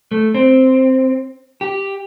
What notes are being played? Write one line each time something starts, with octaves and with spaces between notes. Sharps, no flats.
A3
C4
G4